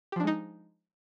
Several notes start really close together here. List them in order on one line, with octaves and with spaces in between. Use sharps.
G4 F3 D4 G#3 D#4